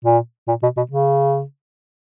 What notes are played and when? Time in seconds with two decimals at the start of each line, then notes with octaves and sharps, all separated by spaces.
0.04 A#2
0.48 A#2
0.63 B2
0.77 B2
0.91 C#3